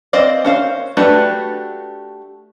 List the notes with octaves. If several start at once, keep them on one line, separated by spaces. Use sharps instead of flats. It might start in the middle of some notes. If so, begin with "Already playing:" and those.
C4 C5 D5 D#5 F5
C#4 C5 F5
A3 D4 F#4 G4 B4